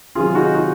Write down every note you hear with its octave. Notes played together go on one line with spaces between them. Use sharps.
C3 D#3 F#3 F4 G#4
G#4
D#4 F#4
D#4 F#4